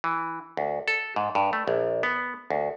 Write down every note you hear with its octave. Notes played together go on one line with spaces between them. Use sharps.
E3
D2
A4
G#2
G2
A3
A#1
B3
D2